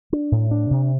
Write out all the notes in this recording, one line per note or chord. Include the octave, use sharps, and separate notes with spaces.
D4
A2
D4
C3